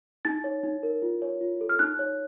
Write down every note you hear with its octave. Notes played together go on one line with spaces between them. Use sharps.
D#4 A6
C#5
D#4
A#4
F4
C#5
F4
A4
F6
D#4 F#6
C#5